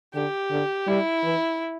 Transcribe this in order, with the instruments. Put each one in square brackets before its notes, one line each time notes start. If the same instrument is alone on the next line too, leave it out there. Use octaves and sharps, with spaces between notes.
[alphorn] D3 [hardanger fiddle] G4
[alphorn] D3
[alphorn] G3 [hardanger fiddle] E4
[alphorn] E3